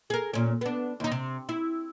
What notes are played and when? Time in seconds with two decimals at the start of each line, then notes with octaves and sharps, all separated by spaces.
0.10 G#4 A#4
0.34 A#2 C#4
0.61 B3 D4
1.00 D#2 D#4
1.12 C3
1.49 E4